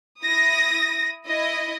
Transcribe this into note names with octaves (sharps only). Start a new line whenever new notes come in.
E4 D#6 A#6
E4 D#5